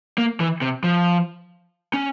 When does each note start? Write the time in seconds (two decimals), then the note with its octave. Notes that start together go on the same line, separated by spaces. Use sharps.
0.18 A#3
0.40 E3
0.62 C3
0.84 F3
1.94 C#4